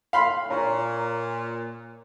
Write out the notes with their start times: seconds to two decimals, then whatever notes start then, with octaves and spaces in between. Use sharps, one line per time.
0.13 F5 B5 C6
0.50 A#2 C#5 A#5 C#6